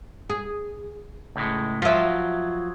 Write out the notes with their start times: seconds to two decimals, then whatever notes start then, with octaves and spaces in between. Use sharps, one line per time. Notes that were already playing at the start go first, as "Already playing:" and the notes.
0.30 G#4
1.36 C#2 A2 G#3
1.82 F3 F#3 F4 E5